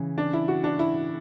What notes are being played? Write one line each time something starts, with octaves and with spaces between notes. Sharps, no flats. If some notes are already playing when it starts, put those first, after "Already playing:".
Already playing: C#3 E3
D4
E4
F#4
D4
E4